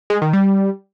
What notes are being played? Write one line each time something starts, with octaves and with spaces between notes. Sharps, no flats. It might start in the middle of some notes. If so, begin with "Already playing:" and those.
G#3
D#3
G3